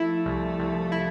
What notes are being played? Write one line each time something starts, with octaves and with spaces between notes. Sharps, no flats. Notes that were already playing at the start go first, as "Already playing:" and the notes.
Already playing: F3 A3 E4
C2
C2
E4